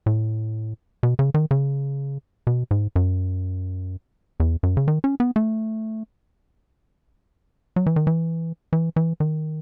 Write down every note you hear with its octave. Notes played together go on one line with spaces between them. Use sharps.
A2
B2
C#3
D#3
C#3
B2
G#2
F#2
E2
F#2
C#3
D#3
C#4
B3
A3
F#3
E3
D#3
E3
E3
E3
D#3